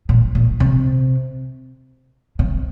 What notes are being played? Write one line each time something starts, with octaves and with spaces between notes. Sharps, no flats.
A#2
A#2
C3
C3